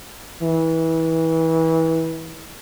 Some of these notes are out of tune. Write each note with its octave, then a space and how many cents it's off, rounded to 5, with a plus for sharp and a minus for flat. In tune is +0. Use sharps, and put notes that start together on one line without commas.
E3 -25